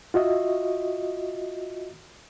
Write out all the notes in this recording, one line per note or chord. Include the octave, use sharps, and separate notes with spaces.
F4 F#4 D#5 E5